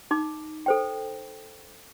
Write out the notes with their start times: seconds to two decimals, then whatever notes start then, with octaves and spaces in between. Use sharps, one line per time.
0.11 D#4 D6
0.66 A4 C5 G5